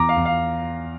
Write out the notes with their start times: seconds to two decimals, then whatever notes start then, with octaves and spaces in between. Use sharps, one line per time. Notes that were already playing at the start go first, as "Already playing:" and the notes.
Already playing: E2 A#5 D6
0.09 F5
0.16 E2
0.25 F5